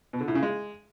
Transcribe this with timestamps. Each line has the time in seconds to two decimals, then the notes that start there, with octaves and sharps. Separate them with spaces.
0.13 B2
0.21 D3
0.28 A2
0.35 C#3
0.43 G#3